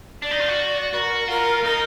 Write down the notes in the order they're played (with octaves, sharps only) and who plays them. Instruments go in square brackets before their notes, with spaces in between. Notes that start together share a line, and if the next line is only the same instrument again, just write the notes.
[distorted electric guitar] D4 [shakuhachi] D5
[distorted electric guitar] D#4
F4
F#4
[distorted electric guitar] F#4 [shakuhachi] A#4 B4
[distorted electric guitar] F4 [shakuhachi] A#4
[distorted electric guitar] D#4 [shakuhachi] A#4